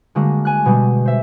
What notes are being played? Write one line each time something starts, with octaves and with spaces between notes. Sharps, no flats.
D3 G3 G#3 A#3 F#4 A#4
G#5 F#6
B2 G3 G#3
C5 E5